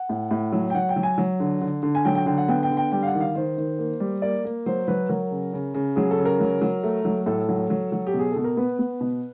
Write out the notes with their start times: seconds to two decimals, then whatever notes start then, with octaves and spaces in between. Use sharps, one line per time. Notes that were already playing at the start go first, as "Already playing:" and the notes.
Already playing: F#5
0.09 A2
0.31 A2
0.52 F#3
0.70 G5
0.75 F#3 F#5
0.89 G5
0.96 F#3
1.03 G#5
1.18 F#3
1.40 D3
1.62 D3
1.83 D3
1.95 G#5
2.05 F#3 G5
2.15 G5
2.26 D3 G5
2.38 F#5
2.48 B3 G5
2.63 G5
2.70 D3
2.77 G5
2.92 G3 G5
3.03 F5
3.07 F#5
3.14 D#3
3.21 F5
3.35 D#3 C5
3.57 D#3
3.79 A#3
4.00 G3
4.22 A#3 D5
4.45 A#3
4.66 F#3 C5
4.88 F#3 B4
5.09 F#3 A#4
5.31 C#3
5.53 C#3
5.74 C#3
5.96 F#3 G#4
6.11 A4
6.18 C#3
6.25 A#4
6.40 F#3
6.61 F#3
6.83 A3
7.05 F#3
7.26 A2 A4
7.49 F#3
7.70 F#3
7.92 F#3
8.07 G4
8.14 B2
8.19 G#4
8.32 B2 A4
8.44 A#4
8.57 B3 B4
8.79 B3
9.01 B2